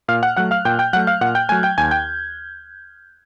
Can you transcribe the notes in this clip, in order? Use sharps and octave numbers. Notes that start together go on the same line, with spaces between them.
A#2 F5 F6
F#5 F#6
F#3 A3 F#5 F#6
F5 F6
A#2 G5 G6
G5 G6
F#3 A3 F#5 F#6
F5 F6
A#2 F#5 F#6
G5 G6
F#3 A3 G#5 G#6
G5 G6
D#2 G#5 G#6
G5 G6